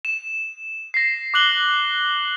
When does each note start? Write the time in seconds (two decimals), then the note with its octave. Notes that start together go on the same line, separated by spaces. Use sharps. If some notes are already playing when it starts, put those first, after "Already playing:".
0.05 E7
0.94 A#6 C7
1.34 D6 F#6 F#7 G7